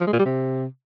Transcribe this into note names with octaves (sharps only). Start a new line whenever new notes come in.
F3
G#3
A#2
G3
C3